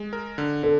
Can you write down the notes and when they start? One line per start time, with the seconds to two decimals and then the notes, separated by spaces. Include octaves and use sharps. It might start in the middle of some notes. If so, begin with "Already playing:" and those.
Already playing: G#3
0.13 A#4
0.38 D3
0.63 D3 A4